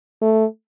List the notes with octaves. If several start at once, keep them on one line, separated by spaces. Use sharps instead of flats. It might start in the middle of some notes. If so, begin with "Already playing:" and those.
A3